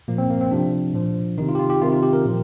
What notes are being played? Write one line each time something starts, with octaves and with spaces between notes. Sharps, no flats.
A#2 F3 A#3
C4
A#3
C4
C3 F3 D4
A#2 F3
C3 D#3 D#4
F4
G4
F4
G4
C3 D#3 F4
F4
G4
A#4
A#2 F3